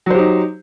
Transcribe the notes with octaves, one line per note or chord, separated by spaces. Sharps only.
F#3 D#4 G4 C5